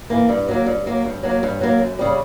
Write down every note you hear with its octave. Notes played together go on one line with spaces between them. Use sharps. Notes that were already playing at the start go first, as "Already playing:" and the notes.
E3 A#3
G2
F#3 A#3
G2
F#3 A#3
G2
F#3 A#3
G2
F#3 A#3
F#2
C#3 G3